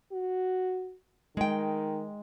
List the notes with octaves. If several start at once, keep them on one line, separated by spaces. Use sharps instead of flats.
F#4
D#3 G#3 G5